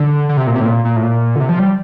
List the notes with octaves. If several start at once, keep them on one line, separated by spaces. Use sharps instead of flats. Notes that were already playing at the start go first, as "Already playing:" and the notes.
Already playing: D3
D3
C3
A#2
C3
A2
A#2
A#2
A2
A#2
D3
C3
F3
G3